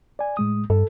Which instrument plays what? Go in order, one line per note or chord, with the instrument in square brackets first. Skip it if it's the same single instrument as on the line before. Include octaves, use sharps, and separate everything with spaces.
[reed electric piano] D5 G#5
A2 G#3 D#6
[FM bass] G2 [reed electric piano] A4